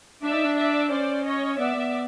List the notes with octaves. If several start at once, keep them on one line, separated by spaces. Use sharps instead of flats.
D4 D5 E5
D#4
D4
D5 E5
C#4 C5 D5
C#5 D#5
B3 D5 E5
B3